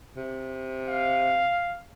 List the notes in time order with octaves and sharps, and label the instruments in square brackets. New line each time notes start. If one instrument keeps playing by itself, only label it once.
[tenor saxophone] C3
[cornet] F5